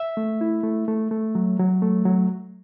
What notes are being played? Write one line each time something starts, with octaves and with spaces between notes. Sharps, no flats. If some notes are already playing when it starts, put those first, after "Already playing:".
Already playing: E5
A3
E4
A3
A3
A3
F#3
F#3
A3
F#3